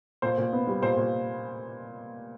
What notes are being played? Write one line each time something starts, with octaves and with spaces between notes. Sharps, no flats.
A#2 C5
A#2
B3
G3
A#2 C5
A#2